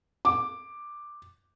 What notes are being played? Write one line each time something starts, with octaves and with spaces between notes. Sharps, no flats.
D6